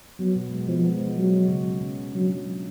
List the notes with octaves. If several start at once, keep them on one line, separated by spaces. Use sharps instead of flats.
F#3 B3
B2
G#3
F3 B3
G#3
G#3
F#3 G#3
F#4
C#3
C#4
C#3
C#3
F#3 D4
F#3
F4